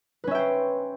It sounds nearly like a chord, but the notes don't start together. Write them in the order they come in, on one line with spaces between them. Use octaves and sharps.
B4 C#4 E5 G5 C5